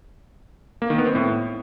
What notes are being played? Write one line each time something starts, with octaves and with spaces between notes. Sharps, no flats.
A#3
D#3
B3
C4
A2